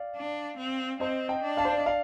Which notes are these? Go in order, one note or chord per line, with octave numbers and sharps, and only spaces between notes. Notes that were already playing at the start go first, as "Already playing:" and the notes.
Already playing: D5 F5
D4
C4
C4 C5 D#5
D#5 G5
D4
F5 A5
C5
D5
D#5
D5 F5